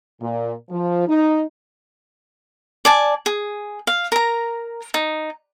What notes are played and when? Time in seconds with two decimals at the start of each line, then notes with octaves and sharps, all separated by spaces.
0.21 A#2
0.71 F3
1.08 D#4
2.85 D5 G#5 A5
3.26 G#4
3.87 F5
4.12 A#4 A#5
4.94 D#4